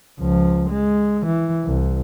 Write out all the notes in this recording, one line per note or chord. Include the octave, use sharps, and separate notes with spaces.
C#2 F3
G#3
E3
C2